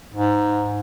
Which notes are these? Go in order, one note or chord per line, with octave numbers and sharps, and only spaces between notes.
G#2